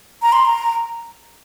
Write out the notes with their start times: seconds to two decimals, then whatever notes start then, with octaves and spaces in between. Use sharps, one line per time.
0.22 A#5
0.32 C6
0.45 A#5